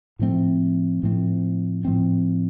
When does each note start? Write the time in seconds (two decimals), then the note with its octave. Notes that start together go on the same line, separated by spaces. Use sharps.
0.19 A2 F3 A3 C4
1.03 A2 F3 A3 C4
1.85 A2 F3 A3 C4